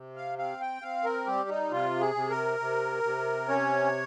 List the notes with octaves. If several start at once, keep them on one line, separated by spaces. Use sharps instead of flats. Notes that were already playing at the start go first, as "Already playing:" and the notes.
Already playing: C3
F5
C4 F5
G5
C4 F5
A#4
G3 G4
D#4
C3 F4
G#4
C3
A#4
C3
C3
C#4 C#5